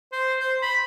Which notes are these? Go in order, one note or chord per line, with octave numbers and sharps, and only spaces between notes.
C5
C5
B5